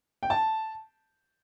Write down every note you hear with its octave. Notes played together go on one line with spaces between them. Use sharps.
G5
A5